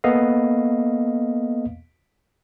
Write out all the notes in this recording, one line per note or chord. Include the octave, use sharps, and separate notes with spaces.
A#3 B3 A4 D#5 F5